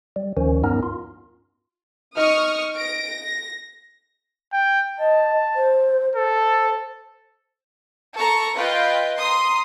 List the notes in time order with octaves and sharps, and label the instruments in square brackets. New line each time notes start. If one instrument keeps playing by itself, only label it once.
[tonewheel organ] G3
D2 D#3 F3 C#4
G2 B3 C#4 D#4 A#4
F4
[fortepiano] D#4 [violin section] C#6 D#6 F6
[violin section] A#6 D7
A#6
[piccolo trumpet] G5
[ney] D#5 [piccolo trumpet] A5
[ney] C5
[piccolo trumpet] A4 [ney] C5
[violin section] A4 A#5 C#6
F4 B4 D#5 G5
A#5 C6 D#6